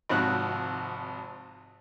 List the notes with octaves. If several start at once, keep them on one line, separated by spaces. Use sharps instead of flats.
G#1 C3 F3 D#4 F#4 F#6